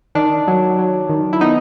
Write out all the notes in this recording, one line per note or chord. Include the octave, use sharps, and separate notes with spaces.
D#3 D4
F#3
F#3
D#3
E4
B3 D#4